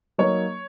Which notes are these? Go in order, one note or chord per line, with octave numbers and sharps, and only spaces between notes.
F#3 A#3 D#4 C#5